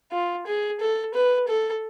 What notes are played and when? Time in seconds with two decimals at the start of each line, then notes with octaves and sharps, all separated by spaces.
0.12 F4
0.47 G#4
0.80 A4
1.14 B4
1.48 A4